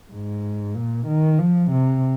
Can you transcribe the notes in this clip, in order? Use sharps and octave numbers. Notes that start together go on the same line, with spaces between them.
G#2
A#2
D#3
F3
C3